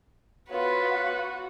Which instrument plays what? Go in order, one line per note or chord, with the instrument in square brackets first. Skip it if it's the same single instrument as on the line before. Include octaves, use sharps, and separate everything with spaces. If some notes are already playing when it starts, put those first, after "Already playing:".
[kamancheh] B3 F4 [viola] F#4 [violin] B4 [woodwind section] C#5 F#5